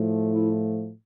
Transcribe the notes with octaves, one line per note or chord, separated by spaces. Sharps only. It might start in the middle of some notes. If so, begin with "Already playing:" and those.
Already playing: A2 F3 A3
E4